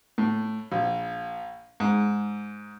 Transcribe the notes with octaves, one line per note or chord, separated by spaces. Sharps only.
A2
A#1
G#2